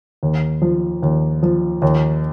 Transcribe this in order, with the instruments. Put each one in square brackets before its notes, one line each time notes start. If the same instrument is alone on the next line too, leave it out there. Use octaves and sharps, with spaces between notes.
[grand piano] D#2
F3
D#2
F3
D#2